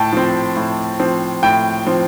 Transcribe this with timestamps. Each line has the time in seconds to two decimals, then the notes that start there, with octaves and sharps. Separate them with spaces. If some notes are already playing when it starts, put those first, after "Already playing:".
Already playing: A2 G5 A5
0.13 F3 C4
0.56 A2
1.00 F3 C4
1.43 A2 G5
1.87 F3 C4